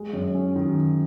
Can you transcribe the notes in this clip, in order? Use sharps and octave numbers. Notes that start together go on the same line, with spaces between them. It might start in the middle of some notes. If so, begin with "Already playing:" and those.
Already playing: G#3
F#2
C#4
D#3